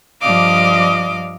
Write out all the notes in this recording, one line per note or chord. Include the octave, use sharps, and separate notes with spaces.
G2 F3 D5 D#5 F5 D6